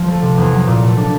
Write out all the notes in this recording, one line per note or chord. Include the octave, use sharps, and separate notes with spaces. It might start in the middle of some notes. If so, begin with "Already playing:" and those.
Already playing: F3
A3
C3
E2
F#3
A#2
A3
D4